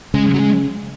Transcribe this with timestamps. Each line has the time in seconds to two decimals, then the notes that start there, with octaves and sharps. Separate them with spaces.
0.14 C#3 G#3
0.34 F#3
0.39 G#3